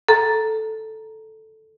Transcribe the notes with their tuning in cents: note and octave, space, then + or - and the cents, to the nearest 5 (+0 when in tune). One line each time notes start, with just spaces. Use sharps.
A4 +0 A#5 +0